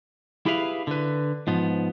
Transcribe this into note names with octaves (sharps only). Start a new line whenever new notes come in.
E4 G4 G#4 B4 E5 F5
D3 B4
G#2 F3 B3